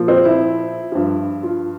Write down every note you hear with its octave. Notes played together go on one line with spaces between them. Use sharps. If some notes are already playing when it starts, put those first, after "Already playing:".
Already playing: A#2 F3
C4
E4
G2 F3
F4